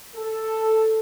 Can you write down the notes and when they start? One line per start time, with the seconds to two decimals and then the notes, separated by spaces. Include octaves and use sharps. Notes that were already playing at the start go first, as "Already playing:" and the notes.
0.15 A4